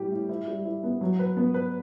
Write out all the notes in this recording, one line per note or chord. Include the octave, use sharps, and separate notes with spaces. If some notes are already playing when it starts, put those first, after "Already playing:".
Already playing: A2 G3 G4
A2
E4
G3
E4
B3
F#3
B4
B3
B4